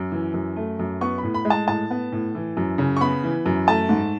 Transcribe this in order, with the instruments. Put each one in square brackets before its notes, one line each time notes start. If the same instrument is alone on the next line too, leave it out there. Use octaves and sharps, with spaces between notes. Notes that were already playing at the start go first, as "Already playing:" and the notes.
Already playing: [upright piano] F#2
E3
F#2
A3
F#2
B3 C#6
B5
A2
B5
G#3
A5
A2 A5
B3
A2
E3
F#2
C#3
C#6
B3 B5
E3
F#2
A3 A5
G#2